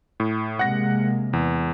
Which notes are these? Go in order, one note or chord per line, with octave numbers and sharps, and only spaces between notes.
A2
C3 G#3 A#3 F#5 A#6
E2